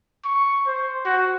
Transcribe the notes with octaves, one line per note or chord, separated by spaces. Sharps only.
C#6
C5
F#4